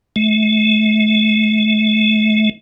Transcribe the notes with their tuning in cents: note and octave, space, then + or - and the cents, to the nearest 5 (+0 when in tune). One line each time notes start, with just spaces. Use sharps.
A3 -35